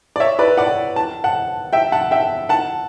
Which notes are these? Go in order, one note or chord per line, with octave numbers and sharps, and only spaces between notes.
D5
C#5 E5
B4 D5
D5 F#5
A5
F#5 A5
E5 G5
F#5 A5
E5 G5
F#5 A5